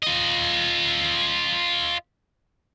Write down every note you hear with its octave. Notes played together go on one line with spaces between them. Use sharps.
F4 D#5